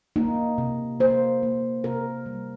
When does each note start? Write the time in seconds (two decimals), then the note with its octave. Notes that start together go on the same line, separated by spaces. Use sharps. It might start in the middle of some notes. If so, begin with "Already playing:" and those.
0.16 A#3 D#4
0.58 C3
1.00 A#3 C5
1.43 A#3
1.84 C3 A#4
2.26 G3